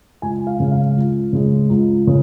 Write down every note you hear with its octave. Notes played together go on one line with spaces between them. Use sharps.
C#2 G#5
F5
C#3 G#3
F5
C#2
C#3 G#3
C#2
C#3